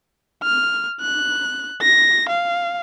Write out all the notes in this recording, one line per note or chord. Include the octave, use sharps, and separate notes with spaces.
F6
F#6
A#6
F5